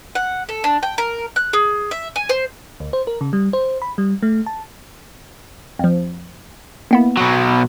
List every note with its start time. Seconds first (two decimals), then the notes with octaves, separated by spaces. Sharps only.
0.15 F#5
0.49 A4
0.64 D4
0.83 G5
0.98 A#4
1.36 F#6
1.53 G#4
1.91 E5
2.16 G#5
2.29 C5
2.80 D2
2.93 C5
3.07 A#4
3.21 C#3
3.33 G3
3.53 C5
3.82 B5
3.98 G3
4.23 A3
4.46 A5
5.79 F2 F3
6.91 A#3 B3 E4
7.17 B2 F#3